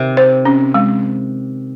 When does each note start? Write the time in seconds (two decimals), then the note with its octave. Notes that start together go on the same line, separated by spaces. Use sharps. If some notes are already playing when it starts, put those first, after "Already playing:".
Already playing: C3 D#3
0.17 C5
0.45 C#4
0.74 G#3